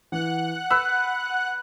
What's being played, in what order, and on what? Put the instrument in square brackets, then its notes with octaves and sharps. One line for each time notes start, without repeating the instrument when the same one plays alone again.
[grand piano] E3 [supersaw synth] F#5 F#6
[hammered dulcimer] B4 [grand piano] E6